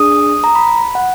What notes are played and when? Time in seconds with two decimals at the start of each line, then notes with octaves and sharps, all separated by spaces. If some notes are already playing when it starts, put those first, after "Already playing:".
Already playing: D4 G#4 D#6
0.44 A#5
0.55 B5
0.95 F#5